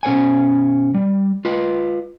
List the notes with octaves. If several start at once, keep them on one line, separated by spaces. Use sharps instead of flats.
B2 C#4 B4 C5 F#5 G#5
G3
F4 B4 D#5